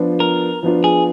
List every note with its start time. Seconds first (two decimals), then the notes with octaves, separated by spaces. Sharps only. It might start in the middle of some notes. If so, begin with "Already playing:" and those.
Already playing: F3 B3 D4 F4
0.20 A#4
0.63 F3 B3 D4 F4
0.84 G#4